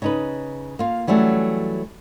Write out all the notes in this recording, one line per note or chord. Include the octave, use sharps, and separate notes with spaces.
C#3 D#4 B4
A#3 F4
E3 F#3 G3 A3 C#4